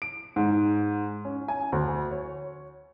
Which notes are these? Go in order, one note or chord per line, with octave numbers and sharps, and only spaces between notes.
D7
G#2
C#4
G#5
D2
C#5